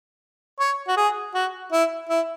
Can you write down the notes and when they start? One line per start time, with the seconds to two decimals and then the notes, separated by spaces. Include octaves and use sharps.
0.59 C#5
0.88 F#4
0.97 G#4
1.34 F#4
1.72 E4
2.09 E4